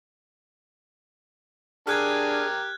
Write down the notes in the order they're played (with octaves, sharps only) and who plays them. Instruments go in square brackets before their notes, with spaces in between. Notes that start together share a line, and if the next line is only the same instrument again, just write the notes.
[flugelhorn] D4 [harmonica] G4 A#4 [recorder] G#4 [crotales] F6 F#6 G#6